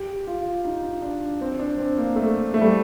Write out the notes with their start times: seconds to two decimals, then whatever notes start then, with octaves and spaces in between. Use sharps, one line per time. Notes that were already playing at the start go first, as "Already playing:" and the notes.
Already playing: G4
0.27 F4
0.65 D#4
1.02 D4
1.41 C4
1.59 D4
1.78 C4
1.98 A#3
2.16 A3
2.54 A3
2.62 G3